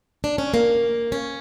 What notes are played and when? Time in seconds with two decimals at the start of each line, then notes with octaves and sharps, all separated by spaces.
0.24 D4
0.38 C#4
0.54 A#3
1.12 C#4